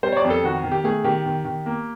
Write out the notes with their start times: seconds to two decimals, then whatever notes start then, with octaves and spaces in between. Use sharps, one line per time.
0.03 G3 C5
0.12 C#5
0.17 D5
0.24 F2
0.30 A4
0.43 D#3 F#4
0.64 D#3
0.72 G4
0.84 A3 G#4
1.04 D#3 G4
1.26 D#3
1.45 D#3
1.66 A#3